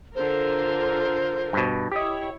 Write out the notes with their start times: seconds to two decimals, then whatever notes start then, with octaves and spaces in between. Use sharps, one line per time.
0.15 D3 F4 A#4 C5
1.53 G2 B2
1.92 E4 G4 C#5 D#5